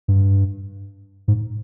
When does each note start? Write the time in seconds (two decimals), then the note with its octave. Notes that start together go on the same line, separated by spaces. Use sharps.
0.08 G2
1.28 G#2